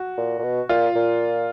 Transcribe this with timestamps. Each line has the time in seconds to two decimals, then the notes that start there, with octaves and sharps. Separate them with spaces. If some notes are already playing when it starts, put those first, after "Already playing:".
Already playing: F#4
0.17 A#2
0.39 A#2
0.43 B2
0.69 A#2 F4
0.95 A#2